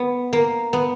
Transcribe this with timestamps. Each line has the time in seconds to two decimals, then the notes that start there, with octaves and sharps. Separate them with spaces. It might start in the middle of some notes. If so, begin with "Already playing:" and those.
Already playing: B3
0.33 A#3
0.73 B3